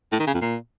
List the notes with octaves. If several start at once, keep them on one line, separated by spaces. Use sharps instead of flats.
A2
D#3
C#3
F2
A#2